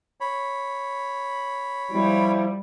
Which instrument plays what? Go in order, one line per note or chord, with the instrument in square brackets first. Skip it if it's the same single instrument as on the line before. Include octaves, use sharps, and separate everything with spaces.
[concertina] C#5 B5
[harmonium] F3 E4 [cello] G3